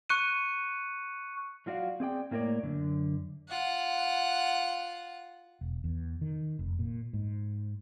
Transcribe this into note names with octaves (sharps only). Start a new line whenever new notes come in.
C#6 F#6 C#7 D#7
F#3 F4 F#4 D5 F5
C4 G#4 D5 G5
A2 A#3 F4 A#4 C#5 D5
F#2 D3
F4 F#5
E1
E2
D#3
F1
A#2
G#2